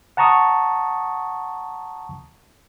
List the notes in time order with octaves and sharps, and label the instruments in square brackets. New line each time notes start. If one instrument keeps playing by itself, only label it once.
[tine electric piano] F#5 A5 A#5 C#6 D#6